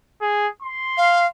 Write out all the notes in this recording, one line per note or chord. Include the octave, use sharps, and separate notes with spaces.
G#4
C6
F5